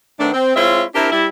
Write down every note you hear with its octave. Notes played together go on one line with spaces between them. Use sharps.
D#3 A3 B3 C4 D4
C4
G#3 C4 E4 F4 C#5 E5
C4 D4 E4 G4 A#4
G3 E4